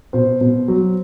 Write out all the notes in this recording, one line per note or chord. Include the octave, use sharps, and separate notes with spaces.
B2 C5
B2
F#3